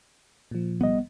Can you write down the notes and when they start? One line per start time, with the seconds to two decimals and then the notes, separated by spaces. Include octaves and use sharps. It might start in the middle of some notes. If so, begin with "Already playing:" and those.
0.51 A#2 F3
0.81 C2 G3 B3 D#5